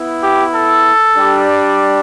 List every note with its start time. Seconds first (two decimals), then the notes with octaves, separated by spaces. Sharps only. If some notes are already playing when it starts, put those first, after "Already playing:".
Already playing: B3 E4
0.22 G4
0.54 A4
1.17 G3 D4 G4